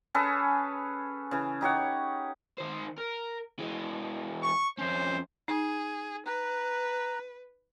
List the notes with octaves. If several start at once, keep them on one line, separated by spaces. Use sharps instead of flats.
C#4 G#4 A4 B4
C#3 E3
D#4 G4 C#5 F#5
D#3 C5
A#4
E3 G#3
C#6
F2 C#4 C5
D#4 G#4
B4 A#5 F#6